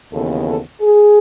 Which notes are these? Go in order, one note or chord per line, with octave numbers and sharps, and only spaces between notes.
D#2 C#3 E3 B3 A4
A4
G#4